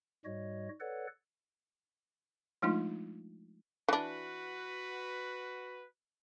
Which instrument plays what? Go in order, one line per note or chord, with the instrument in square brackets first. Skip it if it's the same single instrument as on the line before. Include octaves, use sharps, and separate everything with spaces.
[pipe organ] G#2 G3 F#4 C#5 D#5
A4 B4 C#5 D5 F#5
[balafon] F3 G#3 A3 D4 D#4 F4
[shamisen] E3 D4 [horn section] F#4 B4